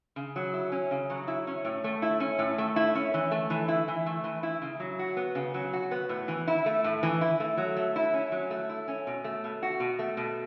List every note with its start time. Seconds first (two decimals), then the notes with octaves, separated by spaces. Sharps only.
0.16 C#3
0.36 F#3
0.53 E4
0.72 C#4
0.91 C#3
1.10 F#3
1.28 E4
1.47 C#4
1.65 A2
1.84 A3
2.02 E4
2.20 C#4
2.39 A2
2.58 A3
2.76 E4
2.95 C#4
3.14 E3
3.31 A3
3.50 E3
3.68 E4
3.88 E3
4.06 A3
4.24 E3
4.43 E4
4.62 C#3
4.80 F#3
4.99 F#4
5.17 B3
5.35 C#3
5.54 F#3
5.73 F#4
5.91 B3
6.09 A2
6.28 E3
6.47 E4
6.66 A3
6.84 A2
7.03 E3
7.21 E4
7.40 A3
7.57 F#3
7.77 A3
7.96 E4
8.14 C#4
8.32 F#3
8.50 A3
8.69 E4
8.88 C#4
9.07 B2
9.24 A3
9.44 B2
9.63 F#4
9.80 B2
9.99 A3
10.17 B2